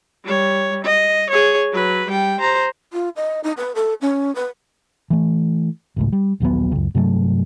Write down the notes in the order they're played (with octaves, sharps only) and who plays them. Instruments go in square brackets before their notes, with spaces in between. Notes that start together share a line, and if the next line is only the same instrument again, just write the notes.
[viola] G3 C#5
D#5
G#4 C#5
F#3 B4
G3 G5
C5 A#5
[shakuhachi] F4
D#5
D#4
B4
A4
C#4
B4
[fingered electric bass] E3 A3
G#1 C#2 A2
G3
A#1 D#2 F#3 B3
C#2 F#2
G2 C3 F#3 A3